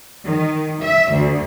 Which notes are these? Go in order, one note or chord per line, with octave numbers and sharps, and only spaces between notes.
D#3
E5
D2